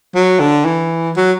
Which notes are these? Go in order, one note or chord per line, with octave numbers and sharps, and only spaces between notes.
F#3
D3
E3
F#3